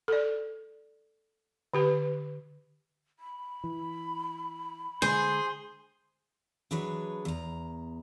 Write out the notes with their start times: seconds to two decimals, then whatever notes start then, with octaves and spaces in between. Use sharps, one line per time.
0.08 A4 D5
1.74 D3 G4 B4
3.19 B5
3.64 E3
5.02 D3 G#3 G#4 C5
6.71 E3 F#3 D4 G#4 B4 C#5
7.25 E2 A#5